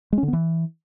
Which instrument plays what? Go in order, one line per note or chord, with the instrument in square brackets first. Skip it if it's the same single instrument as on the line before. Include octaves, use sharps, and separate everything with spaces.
[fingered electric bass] G#3
C#4
D3
B3
E3